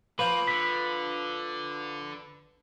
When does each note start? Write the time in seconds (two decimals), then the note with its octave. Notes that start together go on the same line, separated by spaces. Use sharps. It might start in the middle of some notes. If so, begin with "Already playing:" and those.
0.19 F3 A#3 B4 C5
0.48 D3 B6